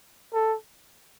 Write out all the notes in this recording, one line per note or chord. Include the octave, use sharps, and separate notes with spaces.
A4